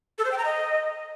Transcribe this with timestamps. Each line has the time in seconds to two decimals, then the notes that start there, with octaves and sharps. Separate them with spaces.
0.18 A4
0.25 C5
0.32 G5
0.38 A#5
0.45 D#5